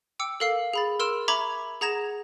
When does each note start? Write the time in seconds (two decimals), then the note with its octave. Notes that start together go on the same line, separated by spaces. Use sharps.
0.19 G5 D6 E6 C#7
0.40 A4 A#4 F5 E6 C7
0.74 G#4 B5 A6
1.00 A#4 C6 E6 F6 D7 E7
1.28 E5 A#5 B5 C#6 D6 G#6
1.81 G#4 F#5 A#5 G#6 A#6 E7